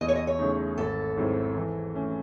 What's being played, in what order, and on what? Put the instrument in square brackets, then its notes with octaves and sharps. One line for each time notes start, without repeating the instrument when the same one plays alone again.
[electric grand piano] E2 [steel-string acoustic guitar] D#5
[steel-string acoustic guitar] C#5
D#5
C#5
[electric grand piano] C#3 F#3 A3 D#4
[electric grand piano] G#1 [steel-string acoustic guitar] A4
[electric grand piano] G#2 F#3 C4 E4
E3
A3 C#4